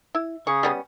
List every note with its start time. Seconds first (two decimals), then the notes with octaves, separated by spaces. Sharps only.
0.15 E4
0.47 C#3 G#4 C#6
0.63 G3 B3 C#4